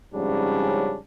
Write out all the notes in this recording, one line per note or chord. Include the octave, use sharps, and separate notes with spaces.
F2 G#2 C#3 G3 C#4 D4